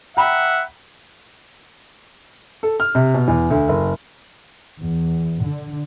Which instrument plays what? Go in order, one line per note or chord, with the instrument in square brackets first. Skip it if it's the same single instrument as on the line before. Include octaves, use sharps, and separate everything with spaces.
[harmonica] E5 F#5 [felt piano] G5 A#5 B5
[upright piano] A4
F6
C3
B2
E2
D2
F#1
[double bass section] E2
D3